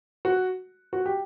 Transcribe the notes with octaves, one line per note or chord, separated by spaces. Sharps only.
F#4
F#4
G4